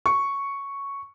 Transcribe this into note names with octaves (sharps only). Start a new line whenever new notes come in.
C#6